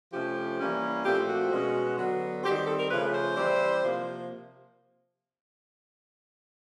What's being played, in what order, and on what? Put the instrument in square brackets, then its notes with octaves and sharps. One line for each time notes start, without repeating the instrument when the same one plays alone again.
[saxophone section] C3 F3 A3 C#4 G4
E3 G3 A#3 C#4
A#2 F3 A3 C4 G4
F#4
B2 G#3 C#4
D3 F#3 B3
D#3 G3 C4 G4
G4
A4
A#4
C#3 F3 A3 C#4 B4
C5
E3 G3 C4
C3 F3 A#3